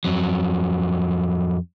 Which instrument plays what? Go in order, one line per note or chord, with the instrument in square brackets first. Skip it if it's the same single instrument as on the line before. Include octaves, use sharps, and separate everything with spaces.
[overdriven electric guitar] F2 F#3